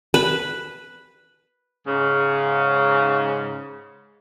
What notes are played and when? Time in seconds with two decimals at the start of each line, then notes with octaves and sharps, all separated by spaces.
0.14 B4
1.86 G#2 C#3